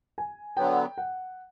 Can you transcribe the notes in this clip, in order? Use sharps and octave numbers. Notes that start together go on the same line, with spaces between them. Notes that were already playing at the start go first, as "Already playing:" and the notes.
G#5
D3 F#3 B3 G5
F#5